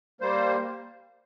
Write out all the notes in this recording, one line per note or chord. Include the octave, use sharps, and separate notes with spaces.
G3 A#3 C5